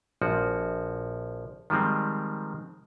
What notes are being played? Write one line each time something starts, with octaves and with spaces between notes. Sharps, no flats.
A#1 F3 F#4
D#3 F3 G3 G#3 C4